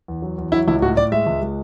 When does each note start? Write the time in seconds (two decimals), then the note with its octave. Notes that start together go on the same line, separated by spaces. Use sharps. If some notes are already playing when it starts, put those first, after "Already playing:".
0.08 E2
0.22 F#3
0.38 E2
0.52 F#3 E4
0.68 C#2 E4
0.82 A2 F#4
0.97 A2 D5
1.12 G#3 E5
1.26 C#2
1.42 G#3